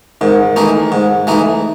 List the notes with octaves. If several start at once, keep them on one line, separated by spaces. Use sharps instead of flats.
G#2 D#3
E3 A3 D#4
G#2
E3 A3 D#4